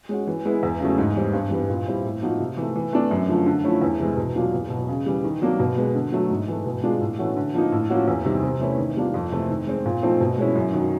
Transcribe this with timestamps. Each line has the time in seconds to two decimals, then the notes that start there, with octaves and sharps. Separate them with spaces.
0.09 G#3 C#4 F#4
0.27 E3
0.45 G#3 B3 E4
0.63 E2
0.80 C#3 F#3 A3
0.98 G#2
1.16 E3 G3 C4
1.33 G2
1.51 E3 G3 B3
1.69 A#2
1.87 G3 C4 E4
2.05 A2
2.22 F3 A#3 D#4 F#4
2.40 C3
2.57 E3 A3
2.76 E3
2.93 A3 D4
3.11 F#2
3.29 D3 F3 A3
3.46 D3
3.64 F3 A3 C#4 E4
3.82 E2
3.99 C3 E3 G#3
4.17 B2
4.36 F#3 A#3 D4 F4
4.53 E2
4.70 B2 F#3 B3
4.89 C#3
5.06 E3 G3
5.24 D#3
5.41 F#3 A#3 D4
5.60 B2
5.77 G#3 B3
5.95 D3
6.12 F#3 A3
6.30 G#2
6.48 E3 A3
6.66 B2
6.84 G#3 B3 D4 F4
7.01 A2
7.18 E3 A3 C#4 F#4
7.37 D3
7.54 F3 A#3 D#4
7.72 A2
7.90 F3 A#3 C#4 F#4
8.08 E2
8.25 C3 D#3 G3
8.43 C3
8.60 E3 A3 C#4 E4
8.78 D#3
8.97 G3 A#3 D4 F4
9.14 F2
9.32 C3 E3 A3 C4
9.50 D#3
9.67 G#3 C4
9.86 A#2
10.02 F3 A3 C4 D#4
10.21 B2
10.38 G#3 C#4 E4
10.56 F#2
10.73 D#3 F#3